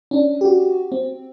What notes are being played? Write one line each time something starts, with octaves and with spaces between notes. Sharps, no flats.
C#4 D4
F#4 G4
C4